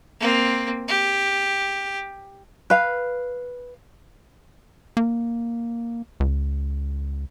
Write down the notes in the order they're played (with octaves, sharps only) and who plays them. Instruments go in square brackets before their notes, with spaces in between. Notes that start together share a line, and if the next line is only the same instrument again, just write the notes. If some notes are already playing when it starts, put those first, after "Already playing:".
[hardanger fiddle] A#3 C4
G4
[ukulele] B4 F5
[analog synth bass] A#3
C#2